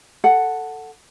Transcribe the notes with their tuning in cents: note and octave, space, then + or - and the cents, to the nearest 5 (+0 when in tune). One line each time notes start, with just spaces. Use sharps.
A4 +10 F#5 +0